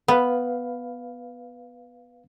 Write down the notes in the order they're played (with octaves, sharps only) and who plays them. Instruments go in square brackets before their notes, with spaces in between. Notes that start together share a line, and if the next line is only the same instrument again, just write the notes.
[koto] B3 [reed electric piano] B4 F5